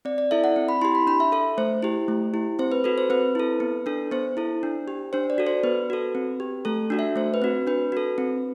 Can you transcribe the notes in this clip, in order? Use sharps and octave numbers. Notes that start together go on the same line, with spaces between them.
C4 D5
D5
E4 A4 E5
F#5
C4
B5
E4 G4 C6
B5
D4 B5
E5
A4 E5
A3 C5
E4 G4
A3
E4 G4
C4 C5
B4
F#4 A4 B4
C5
C4 B4
E4 A4
B3
D4 A4
B3 C5
E4 A4
D4
G4
D4 C5
D5
F#4 A4
C5
B3 B4
F#4 A4
C4
G4
A3 A4
D4 F#4 A4
E5
A3 C5
B4
C4 F#4
D4 B4
F#4 A4
C4